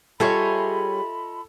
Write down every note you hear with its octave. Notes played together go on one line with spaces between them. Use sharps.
G3 F4 G#4 A4 C#5 D#5 E5 B5